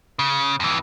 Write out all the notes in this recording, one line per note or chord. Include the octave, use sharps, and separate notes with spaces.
C#3
F2 E3